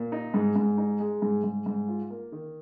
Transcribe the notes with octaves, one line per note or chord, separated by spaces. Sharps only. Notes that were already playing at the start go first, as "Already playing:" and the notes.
Already playing: A#2
D#4
G#2
G#2
D#4
G#3
G#2
G#2
G#2
F4
A#3
D#3